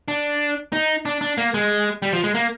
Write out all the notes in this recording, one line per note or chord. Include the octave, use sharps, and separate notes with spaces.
D4
D#4
D4
D4
A#3
G#3
G3
F3
G#3
A#3